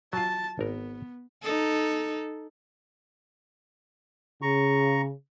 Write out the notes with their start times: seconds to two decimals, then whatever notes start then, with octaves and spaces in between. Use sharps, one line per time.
0.13 F#3 F4 A5
0.59 G#1 B3 A#4
1.43 D#4 A4
4.42 C#3 A#5 C#6